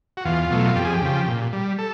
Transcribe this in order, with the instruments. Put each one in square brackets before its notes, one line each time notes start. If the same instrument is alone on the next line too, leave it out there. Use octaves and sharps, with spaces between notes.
[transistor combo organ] F#4
E2 F4
B2 F#3 A3
F2 G4
G#4
G4
C#3 F3
A#2
G3
A4